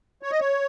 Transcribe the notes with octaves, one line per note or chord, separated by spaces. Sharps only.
C#5
D#5
C#5